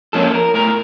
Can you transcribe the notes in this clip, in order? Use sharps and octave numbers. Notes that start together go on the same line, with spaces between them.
F3 A#3 C#4 A4
A#4
A2 A#4